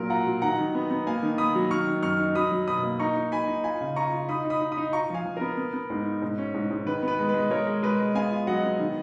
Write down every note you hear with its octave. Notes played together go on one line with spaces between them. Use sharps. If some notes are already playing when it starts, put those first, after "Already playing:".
Already playing: A#2 F#3 A#4
F4 F#5 A#5
F#3
D#3 F#5 A#5
D#3
B3
B3
A#3 F5 G#5
D#3
A#3 B5 D#6
F#3
D#3 C#6 F6
D#3
F#2 C#6 F6
D#4
F#3 B5 D#6
F#3
B2 B5 D#6
A#3
D#4 A#5 C#6
D#4
D#4 G#5 B5
D#4
F4 G#5 B5
C#3
F4 A#5 C#6
F4
D#4 B5 D#6
D#4
B5 D#6
D#4
B5 D#6
D#4
F4 A#5 C#6
F3 F5 G#5
F3
B3 A#4
B3
B3
G#2
D#4
G#2
C#4
G#2
G#2
D#3 B4
B3 B4
G#3
B4
G#3
G#3 A#4 C#5
G#3
G#3 B4
G#3
B3 F5 G#5
F4
F#3 D#5 F#5
B3
D#3